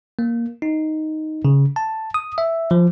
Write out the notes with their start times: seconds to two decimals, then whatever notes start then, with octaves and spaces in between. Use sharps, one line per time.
0.19 A#3
0.62 D#4
1.45 C#3
1.76 A5
2.14 D#6
2.38 E5
2.71 F3